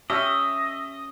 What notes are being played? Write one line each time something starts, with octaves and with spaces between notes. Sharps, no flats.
C#4 G4 D#5 E5